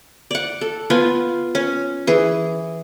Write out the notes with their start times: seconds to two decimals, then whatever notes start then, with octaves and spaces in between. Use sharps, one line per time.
0.31 D5 F#5
0.61 A4
0.90 B3 F4 G#5
1.55 C#4
2.07 E3 G#4